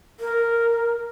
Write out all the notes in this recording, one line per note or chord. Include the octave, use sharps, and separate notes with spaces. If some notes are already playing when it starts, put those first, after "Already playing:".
A#4